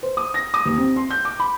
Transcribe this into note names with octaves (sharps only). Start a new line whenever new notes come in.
C5
D#6
A#6
D#6
D#2
C4
C6
G6
D6
B5